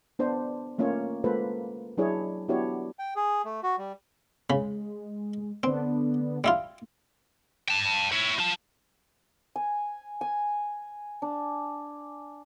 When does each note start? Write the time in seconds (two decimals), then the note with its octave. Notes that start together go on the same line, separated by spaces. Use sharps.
0.19 B3 D4 C5
0.78 A3 A#3 C#4 F4 C#5
1.24 G#3 A#3 F4 A4 B4 C5
1.97 F#3 D4 E4 G#4 C#5
2.49 B3 D4 E4 F#4 G4 C#5
2.99 G5
3.16 G#4
3.45 A3
3.63 F#4
3.78 G3
4.50 C#3 G#3 B5
5.63 D3 B3 C4 D4
6.44 G3 E4 F4
7.68 G5 A5
8.12 E4 C#5
8.39 F4 A5
9.56 G#5
10.21 G#5
11.22 D4